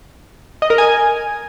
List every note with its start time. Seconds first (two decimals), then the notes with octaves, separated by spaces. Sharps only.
0.62 D#5
0.70 A#4
0.78 G#5